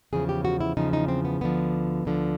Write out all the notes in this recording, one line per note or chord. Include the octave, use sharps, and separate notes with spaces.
E2 C#3 F3 G#4
G4
F#4
E4
E2 C#3 F3 D#4
D#4
C4
B3
D2 D3 F3 B3
D2 D3 F3